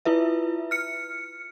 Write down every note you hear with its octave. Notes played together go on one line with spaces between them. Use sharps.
E4 F4 B4 E5
F6 C#7